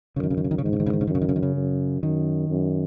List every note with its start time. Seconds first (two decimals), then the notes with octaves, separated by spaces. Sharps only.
0.16 F#2 C#3
0.23 D#3
0.30 C#3
0.37 D#3
0.44 C#3
0.51 D#3
0.58 C#3
0.63 G#2 D#3
0.73 C#3
0.80 D#3
0.86 C#3
0.93 D#3
1.01 C#3
1.07 F#2 D#3
1.15 C#3
1.22 D#3
1.29 C#3
1.36 D#3
1.43 C#3
1.56 F#2
2.03 F#2 D#3
2.50 F#2